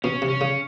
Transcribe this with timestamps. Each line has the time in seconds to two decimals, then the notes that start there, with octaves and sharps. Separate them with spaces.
0.04 B2 C#4
0.22 C3
0.29 C#4
0.41 C#3